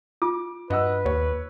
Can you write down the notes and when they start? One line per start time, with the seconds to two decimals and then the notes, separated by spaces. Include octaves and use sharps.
0.22 F4 D6
0.70 G2 B4 D#5 F#5 E6
1.06 D#2 C#5